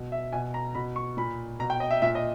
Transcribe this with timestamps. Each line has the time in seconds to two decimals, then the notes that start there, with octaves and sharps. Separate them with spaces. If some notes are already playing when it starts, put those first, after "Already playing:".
Already playing: B2
0.12 E5
0.32 B2 G#5
0.54 A#5
0.75 B2 B5
0.96 C#6
1.17 A#2 B5
1.59 B2 A#5
1.70 G5
1.80 D#5
1.91 E5
2.02 A#2 E5
2.15 D#5